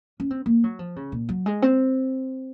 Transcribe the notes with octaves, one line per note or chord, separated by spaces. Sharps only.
C#4
C4
A#3
F#3
F3
C#3
A#2
F#3
G#3
C4